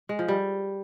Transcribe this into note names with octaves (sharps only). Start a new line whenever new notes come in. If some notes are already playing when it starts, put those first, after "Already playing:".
G#3
F3
G3